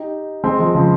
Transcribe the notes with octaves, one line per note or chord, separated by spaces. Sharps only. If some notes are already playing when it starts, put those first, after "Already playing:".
Already playing: D#4 G4
G#3 C4
F3 G#3
C#3 F3